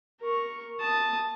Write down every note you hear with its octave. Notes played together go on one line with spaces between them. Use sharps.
A#4 C#6
A5 D#6